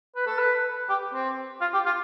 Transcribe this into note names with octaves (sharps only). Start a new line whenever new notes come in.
B4
A4
B4
G4
C4
F4
G4
F4